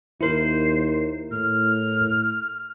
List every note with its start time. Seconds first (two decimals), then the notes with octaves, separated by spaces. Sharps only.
0.21 D#2 E4 A#4 C5
1.31 A2 F6